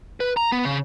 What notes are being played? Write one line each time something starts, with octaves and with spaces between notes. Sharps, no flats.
B4
A#5
B3
C#3